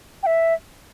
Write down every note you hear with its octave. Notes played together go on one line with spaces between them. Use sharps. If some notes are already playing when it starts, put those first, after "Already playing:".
G5
E5